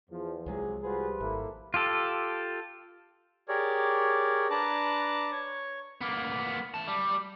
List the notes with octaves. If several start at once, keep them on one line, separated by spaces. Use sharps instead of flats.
E2 F3
C2 C3 F3 F#3 G#3 G#4
G3 F4 F#4 G#4 B4 C5
G#1 A#3 E4 A4
F4 G4 A4
G4 G#4 A#4 C#5 D5
D4 B4 A5 A#5 D6 F#6
C#5 C#6
A#3 B3
E3 A5
G3